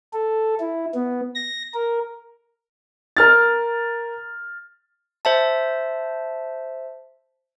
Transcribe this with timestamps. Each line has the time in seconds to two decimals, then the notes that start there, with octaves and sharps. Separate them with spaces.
0.13 A4
0.60 E4
0.95 B3
1.35 A#6
1.74 A#4
3.17 A#4 F6 A6
5.25 C5 E5 A5